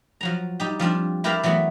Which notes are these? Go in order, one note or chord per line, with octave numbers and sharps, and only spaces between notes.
F3 F#3 A#5
G3 D#4 G4
F3 G3 C4 D4
E4 G4 A#4 B4 D5 F5
E3 F#3 A3 B3